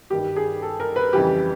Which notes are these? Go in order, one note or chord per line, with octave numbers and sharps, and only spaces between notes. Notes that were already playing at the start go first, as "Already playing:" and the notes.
G2 D#3 G3 G4
G#4
A4
A#4
B4
F2 C#3 E3 G3 G4